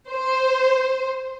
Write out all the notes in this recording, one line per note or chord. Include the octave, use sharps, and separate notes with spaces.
C5